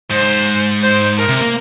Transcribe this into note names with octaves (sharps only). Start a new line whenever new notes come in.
G#2 C5
C5
A#4
C3
A#3